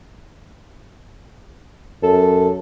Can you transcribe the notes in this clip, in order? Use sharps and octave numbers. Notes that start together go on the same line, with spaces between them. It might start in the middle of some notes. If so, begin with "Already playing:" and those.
F#2 A4